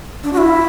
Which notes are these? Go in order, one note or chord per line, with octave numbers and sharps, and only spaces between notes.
D4
F#4
E4